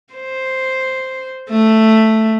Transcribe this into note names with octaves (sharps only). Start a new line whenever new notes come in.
C5
A3